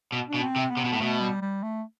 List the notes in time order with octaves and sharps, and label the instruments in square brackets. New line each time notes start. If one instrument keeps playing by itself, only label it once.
[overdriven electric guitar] B2
[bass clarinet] D4
[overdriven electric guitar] B2
[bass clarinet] C4
[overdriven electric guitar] C3
[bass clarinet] B3
[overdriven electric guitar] C3
B2
A2
[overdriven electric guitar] B2 [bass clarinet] A3
[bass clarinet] G3
G3
A3